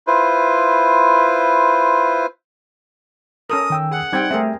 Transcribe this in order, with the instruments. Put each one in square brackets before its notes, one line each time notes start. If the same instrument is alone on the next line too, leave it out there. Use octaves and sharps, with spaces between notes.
[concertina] E4 F4 B4 C5
[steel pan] C#4 A4 A#4 [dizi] D#6
[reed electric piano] D#3 G5 E6
[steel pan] G#4 [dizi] F#5
[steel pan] G3 C4 G5 [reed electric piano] D#4 G#6
[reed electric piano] A3 E5 [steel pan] C4 G#4 A#4